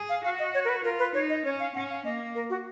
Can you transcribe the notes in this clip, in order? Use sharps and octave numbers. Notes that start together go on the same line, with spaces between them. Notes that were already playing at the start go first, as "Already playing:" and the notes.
Already playing: G#4
F5
F#4 F5
D#5
C#5
A#4
B4
F4 A#4
B4
D#4 C#5
D#5
C#4 C#5
F5
C#4 F#5
F5
A#3 D#5
A#4
F#4